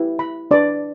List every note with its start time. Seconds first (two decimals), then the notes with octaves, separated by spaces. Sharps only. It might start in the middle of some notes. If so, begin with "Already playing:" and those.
Already playing: E4 G4 B4
0.19 B5
0.51 D4 B4 D5